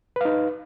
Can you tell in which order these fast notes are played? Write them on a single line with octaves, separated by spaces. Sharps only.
B4 F5 D#4